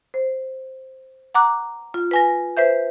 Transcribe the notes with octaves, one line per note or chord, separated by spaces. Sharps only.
C5
F#5 A#5 D6 F#6
F4
B4 G#5 A#6
B4 C5 E5 G6